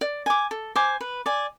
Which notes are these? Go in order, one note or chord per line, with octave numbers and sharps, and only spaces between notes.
D5
G#5 D6
A4
C5 G#5 D6
B4
D5 G#5